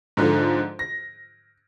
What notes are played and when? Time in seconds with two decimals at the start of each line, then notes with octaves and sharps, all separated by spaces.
0.17 G#2 D3 F3
0.79 A#6